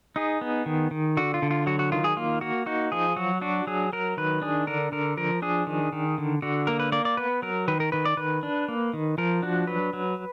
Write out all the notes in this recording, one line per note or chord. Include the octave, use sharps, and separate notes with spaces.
D#4 G#4
B3
D#3
D#3
D3 F#4
F4
D3
F4
F#3 F#4
F#4
D#3 F4
G#4
A#3 F4
A#3 F#4
D#4 F#4
F3 G#4
F#3 F#4
D4 F#4
F#3 G#4
F#3 A#4
D#3 B4
D4 G#4
D3 A#4
D3 A#4
F3 A#4
D4 G#4
D#3
D#3
D3
D3 F#4
A#3 A#4
B4
A#3 D5
D5
B3 B4
F#3 A#4
D#3 B4
A#4
D#3 B4
D5
D#3 B4
D4
A#3
D#3
F3 A#4
D4 F#4
F#3 B4
F#3